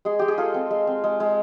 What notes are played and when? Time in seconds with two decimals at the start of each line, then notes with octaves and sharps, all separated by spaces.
0.05 G#3 G#4
0.19 G#3 G4
0.28 G#4
0.38 F4 A4
0.54 C4
0.71 G#3
0.87 C4
1.04 G#3
1.20 G#3